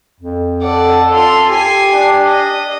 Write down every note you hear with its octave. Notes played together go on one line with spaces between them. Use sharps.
F2
A4 D5 F#5
F4 C6
G4 G#5 C7
D4
D#5